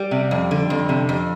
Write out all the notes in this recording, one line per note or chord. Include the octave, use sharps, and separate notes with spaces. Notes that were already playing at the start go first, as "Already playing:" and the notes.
Already playing: G3
C3
F2
D3
F2
C3
F2